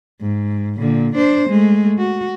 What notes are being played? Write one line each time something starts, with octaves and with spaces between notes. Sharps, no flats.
G#2
A#2 D3
D4 C5
G#3 A3
F#4